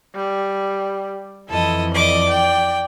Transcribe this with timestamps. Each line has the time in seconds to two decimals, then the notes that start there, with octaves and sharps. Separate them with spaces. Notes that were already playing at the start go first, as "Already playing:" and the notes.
0.15 G3
1.49 F2 E3 E4 A4 D#5
1.94 D5 D#5 D6
2.29 G5